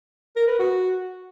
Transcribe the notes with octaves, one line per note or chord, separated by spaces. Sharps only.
A#4
B4
F#4